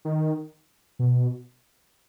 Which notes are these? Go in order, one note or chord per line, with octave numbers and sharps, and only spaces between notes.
D#3
B2